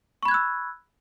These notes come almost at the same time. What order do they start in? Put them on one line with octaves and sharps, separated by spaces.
C#6 B5 G#6 F#6 E6